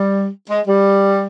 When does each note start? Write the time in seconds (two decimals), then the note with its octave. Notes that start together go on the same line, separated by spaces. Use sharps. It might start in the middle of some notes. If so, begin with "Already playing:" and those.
Already playing: G3
0.49 G#3
0.68 G3